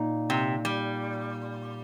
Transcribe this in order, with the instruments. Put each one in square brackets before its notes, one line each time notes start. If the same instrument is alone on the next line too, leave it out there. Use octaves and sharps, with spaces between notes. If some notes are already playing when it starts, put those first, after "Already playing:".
Already playing: [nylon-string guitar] A#2 D#4
[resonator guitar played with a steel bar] C3
G3